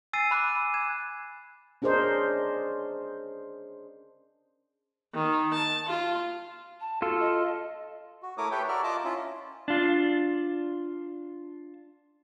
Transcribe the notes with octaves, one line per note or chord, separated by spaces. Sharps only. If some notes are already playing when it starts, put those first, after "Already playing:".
G#5 E6 A6 C7 D#7
B5 D6 F#6
G#6 E7
C#4 D4 G#4 A#4 C5 D#5
D#3
A5
F4
A5
F4 F#4 A4
D#5
F#4
A3 E4 A#4 C#5 D6 D#6
G4 A4 B4 C#5 E5 G5
F#4 A#4 D5 E5 F6
F4 D#5 A5 D6
C#4 E4 F4
D4 F4